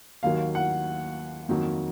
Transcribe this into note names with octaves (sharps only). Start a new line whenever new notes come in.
D#2 D#3 F#3 A#3 F5
F#5
F2 D#3 F#3 A#3